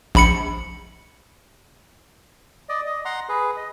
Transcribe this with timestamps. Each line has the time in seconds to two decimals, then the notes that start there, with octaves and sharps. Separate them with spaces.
0.15 A#1 B5 C#7
2.69 D5 D#5
2.86 D#5
3.05 F#5 A#5 C6
3.29 G#4 B4
3.57 D#5